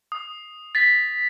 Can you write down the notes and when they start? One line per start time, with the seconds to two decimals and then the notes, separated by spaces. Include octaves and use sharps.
0.12 D#6
0.75 A6 B6